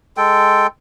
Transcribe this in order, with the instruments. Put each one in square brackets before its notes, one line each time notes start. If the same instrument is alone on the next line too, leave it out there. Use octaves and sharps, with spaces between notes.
[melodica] G#3 A4 G5